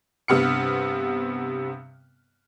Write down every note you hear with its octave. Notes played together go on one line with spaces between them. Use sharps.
G2 C3 B3 F6 C#7